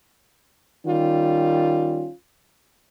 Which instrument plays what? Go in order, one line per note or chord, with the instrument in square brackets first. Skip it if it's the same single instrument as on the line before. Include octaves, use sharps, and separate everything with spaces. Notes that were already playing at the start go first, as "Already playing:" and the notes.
[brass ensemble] D#3 G3 C#4 F4